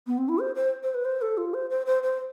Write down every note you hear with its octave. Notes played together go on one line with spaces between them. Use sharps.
B3
C4
E4
C5
C5
C5
B4
C5
A4
F4
C5
C5
C5
C5